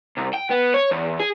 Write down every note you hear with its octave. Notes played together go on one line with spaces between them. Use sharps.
C2
G5
B3
C#5
E2
G#4